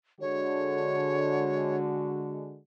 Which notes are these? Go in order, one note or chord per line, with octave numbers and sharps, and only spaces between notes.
D3 G#3 F#4 C#5